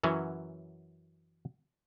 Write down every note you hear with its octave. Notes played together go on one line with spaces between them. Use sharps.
F#2 E3 F#3 C#4